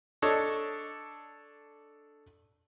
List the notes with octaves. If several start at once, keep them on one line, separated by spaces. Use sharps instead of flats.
D4 A4 C#5 D#5